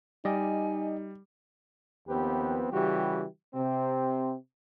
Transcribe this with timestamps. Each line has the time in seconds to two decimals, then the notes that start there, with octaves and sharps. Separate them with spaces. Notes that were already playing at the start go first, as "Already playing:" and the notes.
0.25 G3 D#4 D5 D#5 G5 G#5
2.08 D#2 F3 B3 C4 G4 B4
2.72 C#3 E3 G3 F#4 G4
3.54 C3 C4